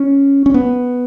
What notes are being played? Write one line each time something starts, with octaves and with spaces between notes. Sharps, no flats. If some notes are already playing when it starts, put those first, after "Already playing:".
Already playing: C#4
C#4
B3